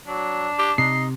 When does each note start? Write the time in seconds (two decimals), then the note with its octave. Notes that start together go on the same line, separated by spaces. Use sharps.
0.07 F#3 D4
0.59 G4
0.78 C3 D#4 C7